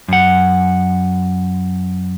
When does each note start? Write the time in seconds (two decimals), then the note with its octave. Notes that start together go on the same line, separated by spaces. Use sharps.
0.08 F#2 F#5